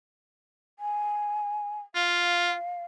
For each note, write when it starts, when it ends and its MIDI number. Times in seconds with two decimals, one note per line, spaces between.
0.79 1.80 80
1.95 2.54 65
1.95 2.85 77